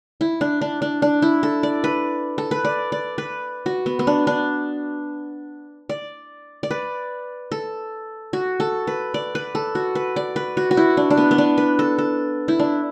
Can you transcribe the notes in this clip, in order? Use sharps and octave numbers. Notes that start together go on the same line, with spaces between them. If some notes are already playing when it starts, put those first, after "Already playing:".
E4
D4
D4
D4
D4
E4
A4
D5
B4
A4
B4
D5
D5
B4
F#4
B3
B3
D4
D4
D5
D5
B4
A4
F#4
A4
B4
D5
B4
A4
F#4
B4
D5
B4
F#4
F#4
E4
D4
D4
B3
B3
D4
B4
A4
A4
E4
D4